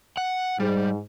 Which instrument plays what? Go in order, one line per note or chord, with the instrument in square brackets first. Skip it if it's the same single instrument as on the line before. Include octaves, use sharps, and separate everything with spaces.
[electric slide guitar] F#5
[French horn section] G#2 [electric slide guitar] G3